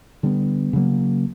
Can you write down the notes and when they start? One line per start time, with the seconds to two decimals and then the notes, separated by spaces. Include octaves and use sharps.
0.23 D3 G3 B3
0.73 C#3 F#3 A#3